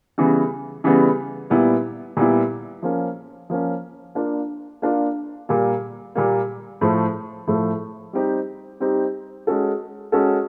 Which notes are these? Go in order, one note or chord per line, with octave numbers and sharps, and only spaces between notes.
C#3 E3 G3 B3
C#3 E3 G3 B3
A#2 G3 B3 E4
A#2 G3 B3 E4
F3 A#3 C#4
F3 A#3 C#4
A#3 D4 F4
A#3 D4 F4
A#2 G3 A#3
A#2 G3 A#3
A2 F3 A3
A2 F3 A3
G3 C4 D#4 G4
G3 C4 D#4 G4
G#3 C#4 F#4 A4
G#3 C#4 F#4 A4